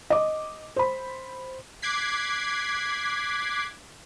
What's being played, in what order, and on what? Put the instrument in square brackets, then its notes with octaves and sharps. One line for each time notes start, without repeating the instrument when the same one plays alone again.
[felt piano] D#5 D6
C5 B5
[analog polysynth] D6 F#6 G#6 B6 C7